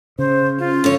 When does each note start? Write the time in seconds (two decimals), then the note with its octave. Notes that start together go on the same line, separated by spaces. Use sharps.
0.19 C#3 C5
0.59 C#4 F4
0.84 D3 C#5